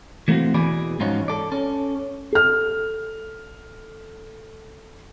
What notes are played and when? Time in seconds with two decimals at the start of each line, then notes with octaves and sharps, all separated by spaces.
0.28 E3 A3 A#3 C4 F#4
0.54 E2 B2 E3 G#4 D5 B5
1.00 G#2 F3 C#4 D#4 F4 F#4
1.28 A4 D5
1.52 C#4 A4
2.32 A4 F6